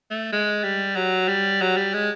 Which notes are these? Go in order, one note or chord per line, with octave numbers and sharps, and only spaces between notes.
A3
G#3
G3
F#3
G3
F#3
G3
G#3